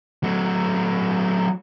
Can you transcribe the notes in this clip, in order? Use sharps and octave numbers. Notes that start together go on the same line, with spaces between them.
F#3 A3